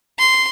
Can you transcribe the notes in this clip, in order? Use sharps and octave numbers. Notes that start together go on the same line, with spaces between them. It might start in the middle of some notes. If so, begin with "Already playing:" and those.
C6